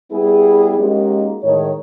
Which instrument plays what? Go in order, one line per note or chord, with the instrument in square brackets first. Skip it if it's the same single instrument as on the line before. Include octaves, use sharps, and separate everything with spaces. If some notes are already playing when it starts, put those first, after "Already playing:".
[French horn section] G3 B3 E4 G#4
G#3 A#3 C#4 D#4 F#4 G4
A2 D#3 G#3 C#5